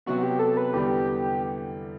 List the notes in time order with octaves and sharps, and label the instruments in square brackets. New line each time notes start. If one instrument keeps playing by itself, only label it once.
[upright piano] C3 F#3 B3 [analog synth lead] F#4
[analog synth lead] G4
A4
B4
[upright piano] E2 D3 G3 B3 [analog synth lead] G4